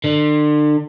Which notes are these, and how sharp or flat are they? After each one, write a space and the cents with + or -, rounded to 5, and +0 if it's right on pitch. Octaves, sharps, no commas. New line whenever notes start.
D3 +35